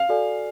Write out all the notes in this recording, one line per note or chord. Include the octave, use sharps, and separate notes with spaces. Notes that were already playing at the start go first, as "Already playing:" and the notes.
Already playing: F5
F#4 A4 D5 G#5